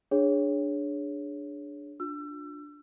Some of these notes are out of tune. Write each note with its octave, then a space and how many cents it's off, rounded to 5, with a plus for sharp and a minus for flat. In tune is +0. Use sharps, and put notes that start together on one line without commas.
D4 +0 G#4 -5 C#5 +0
D4 +0 F4 +35 E6 +30